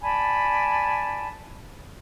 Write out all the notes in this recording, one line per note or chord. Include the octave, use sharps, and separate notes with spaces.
D5 G#5 A5 B5